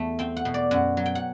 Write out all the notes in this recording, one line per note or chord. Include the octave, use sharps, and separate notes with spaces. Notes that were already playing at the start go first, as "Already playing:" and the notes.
Already playing: E2 A3 A4
C4 G5
F#5
B2
D5
F#2 F#5
F#3
G5
F#5